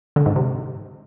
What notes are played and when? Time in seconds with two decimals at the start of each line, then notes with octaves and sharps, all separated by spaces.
0.16 D3
0.26 G#2
0.36 C3